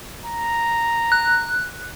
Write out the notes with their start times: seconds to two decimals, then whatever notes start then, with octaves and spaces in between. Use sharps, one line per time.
0.24 A#5
1.12 F#6